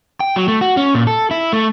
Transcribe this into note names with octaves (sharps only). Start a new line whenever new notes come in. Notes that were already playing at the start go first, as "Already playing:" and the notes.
G5
F#3
A3
F#4
C#4
A#2
A4
E4
A3